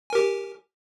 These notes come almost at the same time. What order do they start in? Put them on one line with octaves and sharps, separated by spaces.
G#5 A#4 G4